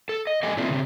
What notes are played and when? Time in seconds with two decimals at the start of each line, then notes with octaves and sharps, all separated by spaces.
0.09 A4
0.27 D#5
0.43 G4 A4 D5 D#5 G5 G#5
0.57 A3 A#3 C4 D4 E4 F4
0.70 C#3 C4